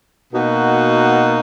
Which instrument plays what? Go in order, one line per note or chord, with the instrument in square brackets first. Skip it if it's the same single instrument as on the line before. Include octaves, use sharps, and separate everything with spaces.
[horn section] B2 A#3 D#4 F#4